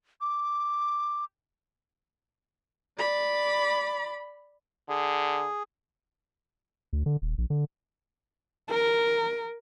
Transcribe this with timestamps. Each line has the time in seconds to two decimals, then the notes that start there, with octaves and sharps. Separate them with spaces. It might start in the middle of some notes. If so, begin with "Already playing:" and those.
0.21 D6
2.99 D5 B5
4.89 D3 G#4
6.93 D2
7.06 D3
7.22 D#1
7.38 A#1
7.50 D3
8.69 A#4